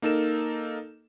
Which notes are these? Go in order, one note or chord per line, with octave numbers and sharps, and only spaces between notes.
A#3 D#4 A4 A#4 E7